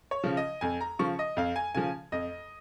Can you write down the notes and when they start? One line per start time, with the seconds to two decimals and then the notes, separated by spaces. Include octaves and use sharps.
0.11 C#5
0.24 C#3 F3
0.37 D#5
0.61 F2 G#5
0.81 A#5
0.99 C#3 F3 C#6
1.19 D#5
1.37 F2 F5
1.56 G#5
1.75 C#3 F3 G#5
2.12 F2 D#5